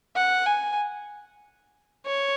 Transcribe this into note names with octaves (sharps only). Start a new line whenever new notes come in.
F#5
G#5
C#5